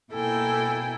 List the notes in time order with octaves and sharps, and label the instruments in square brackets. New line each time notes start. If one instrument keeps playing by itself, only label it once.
[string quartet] B2 A#3 E4 A4 G5 G#5